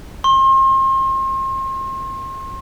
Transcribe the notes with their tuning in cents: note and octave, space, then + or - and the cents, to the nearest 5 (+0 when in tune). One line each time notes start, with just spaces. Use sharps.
C6 +40